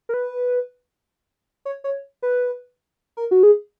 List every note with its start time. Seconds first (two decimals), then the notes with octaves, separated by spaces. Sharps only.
0.09 A#4
0.14 B4
1.65 C#5
1.84 C#5
2.22 B4
3.17 A#4
3.31 F#4
3.43 G#4